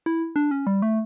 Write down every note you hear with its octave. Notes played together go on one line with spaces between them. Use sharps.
E4
D4
C#4
G3
A3